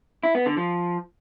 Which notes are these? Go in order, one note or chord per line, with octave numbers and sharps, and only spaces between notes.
E4
B3
D3
F3